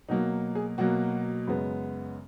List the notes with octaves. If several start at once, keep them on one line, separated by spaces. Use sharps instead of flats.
B2 F#3 A#3 D#4
G#4
B2 F#3 A#3 F#4
F#2 C#3 G#3 B3